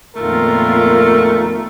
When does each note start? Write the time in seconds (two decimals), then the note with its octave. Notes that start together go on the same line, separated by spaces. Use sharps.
0.16 F2 A#2 D#3 A3 B3 F4 A#4